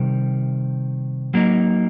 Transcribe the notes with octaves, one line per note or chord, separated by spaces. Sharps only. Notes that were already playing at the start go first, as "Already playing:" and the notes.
Already playing: C3 D#3 G3
F#3 A#3 D#4